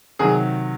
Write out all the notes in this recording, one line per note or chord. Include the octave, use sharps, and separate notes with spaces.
C3 D#3 F#3 G#4